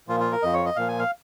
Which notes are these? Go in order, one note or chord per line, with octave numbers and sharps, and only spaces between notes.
A#2 F3 F4
F4
A#4
F2 F3 D#5
C#5
D#5
A#2 F3 F5
G#5
F5